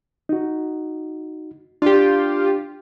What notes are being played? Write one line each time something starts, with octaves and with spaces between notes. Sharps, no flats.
D#4 F#4
D4 F4 G4